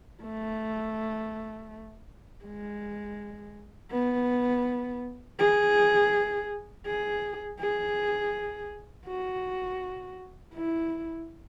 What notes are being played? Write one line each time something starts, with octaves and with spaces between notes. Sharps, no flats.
A3
G#3
B3
G#4
G#4
G#4
F#4
E4